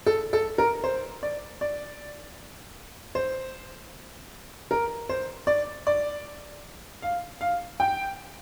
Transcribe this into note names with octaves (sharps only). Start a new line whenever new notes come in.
A4
A4
A#4
C5
D5
D5
C5
A#4
C5
D5
D5
F5
F5
G5